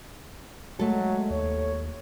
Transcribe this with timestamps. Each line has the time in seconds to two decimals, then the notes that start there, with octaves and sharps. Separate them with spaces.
0.79 F#3 G#3 A3 A4
1.30 D#2 C#5